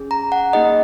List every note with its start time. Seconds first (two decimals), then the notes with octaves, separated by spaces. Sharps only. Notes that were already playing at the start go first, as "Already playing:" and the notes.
Already playing: C#4 G#4
0.11 A#5
0.32 F#5
0.53 A#3 D#4 G#4 D#5